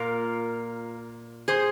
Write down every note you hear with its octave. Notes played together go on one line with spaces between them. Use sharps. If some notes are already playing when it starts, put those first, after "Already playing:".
Already playing: A#2 A#3 F4 A#4
G#4 C5